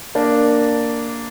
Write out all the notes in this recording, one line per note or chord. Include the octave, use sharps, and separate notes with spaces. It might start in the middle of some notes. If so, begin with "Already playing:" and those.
A#3 D4